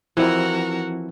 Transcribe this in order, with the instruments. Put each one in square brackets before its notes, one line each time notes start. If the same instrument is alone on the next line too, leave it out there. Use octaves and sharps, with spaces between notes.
[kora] E3 [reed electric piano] F3 C4 E4 [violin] F#4 A#4